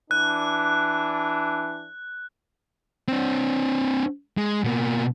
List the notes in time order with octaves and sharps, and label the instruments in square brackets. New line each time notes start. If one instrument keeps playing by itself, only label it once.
[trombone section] E3 D4 [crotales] F#6
[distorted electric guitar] C4 D4
G#3
B2 A#3